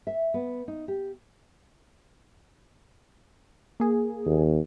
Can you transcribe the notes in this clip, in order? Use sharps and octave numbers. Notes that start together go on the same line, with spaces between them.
E5
B3
D#4
G4
A#3 G#4
D#2